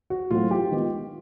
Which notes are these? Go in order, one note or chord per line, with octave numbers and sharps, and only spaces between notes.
F#4
A2 F#3 A3 C4 F4
G4
D#3 G#3 B3